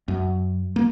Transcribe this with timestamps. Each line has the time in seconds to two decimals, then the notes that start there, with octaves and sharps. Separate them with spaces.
0.08 F#2
0.76 A#3